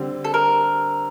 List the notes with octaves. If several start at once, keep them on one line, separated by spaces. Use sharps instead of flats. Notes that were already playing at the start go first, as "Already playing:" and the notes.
Already playing: D3 G3 C4
A4
A#4